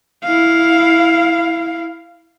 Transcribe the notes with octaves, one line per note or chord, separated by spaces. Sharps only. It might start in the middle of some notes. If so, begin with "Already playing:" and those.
E4 F5